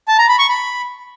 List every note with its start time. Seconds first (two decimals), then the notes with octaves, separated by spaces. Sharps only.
0.08 A5
0.18 A#5
0.28 B5
0.39 C#6
0.49 B5